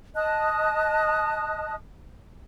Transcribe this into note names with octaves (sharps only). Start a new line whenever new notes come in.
D#5 A5 D#6 F#6